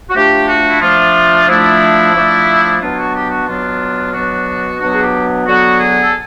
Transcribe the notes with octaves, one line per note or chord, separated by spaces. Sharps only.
F#4
F3 A3 D4 G4
F#4
E4
F3 A3 D4 F4
F3 A3 D4 E4
F3 A3 D4
B2 F#3 B3 D4 F4
F#4
G4
F#4
B2 F#3 B3 D4 F4
B2 F#3 B3 D4 F#4
B2 F#3 B3 D4 F#4
G#4
G4
D3 F#3 B3 F#4
G#4
A4